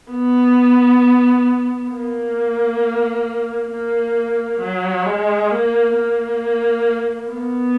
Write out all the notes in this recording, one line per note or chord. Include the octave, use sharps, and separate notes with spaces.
B3
A#3
A#3
F#3
G#3
A#3
A#3
B3